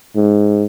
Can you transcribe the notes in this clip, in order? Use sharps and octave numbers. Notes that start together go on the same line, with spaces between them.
G#2